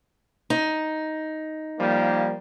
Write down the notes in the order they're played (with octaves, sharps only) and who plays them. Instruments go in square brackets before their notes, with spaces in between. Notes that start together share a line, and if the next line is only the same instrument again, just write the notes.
[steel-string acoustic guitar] D#4
[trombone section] F3 G3 A#3